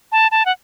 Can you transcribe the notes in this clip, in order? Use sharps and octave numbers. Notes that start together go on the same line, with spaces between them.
A5
A5
F#5